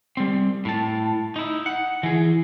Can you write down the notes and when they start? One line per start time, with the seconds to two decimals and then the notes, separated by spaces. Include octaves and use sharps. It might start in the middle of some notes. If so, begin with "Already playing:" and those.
0.17 G3 C4
0.65 A2 A5
1.36 D#4 E4
1.66 F#5
2.03 E3 G#4